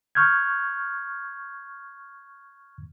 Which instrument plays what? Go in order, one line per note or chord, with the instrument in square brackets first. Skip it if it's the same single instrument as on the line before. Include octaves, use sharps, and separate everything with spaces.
[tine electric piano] C#6 F6 G6 G#6